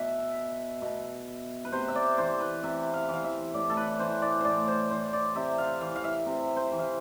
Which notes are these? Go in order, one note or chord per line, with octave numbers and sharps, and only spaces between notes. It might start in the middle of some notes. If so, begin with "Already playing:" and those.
Already playing: B2 E5
B2
B4
C3 C5
E5
D5
E3 C5
B4
C3 E5
F5
E3 F5
E5
A2 D5
A4
B4
E3 C5
D5
A2 C5 D5
C5
E3 C5
D5
C3 E5
F5
E3 F5
F5
E5
C3
C5
E3
F5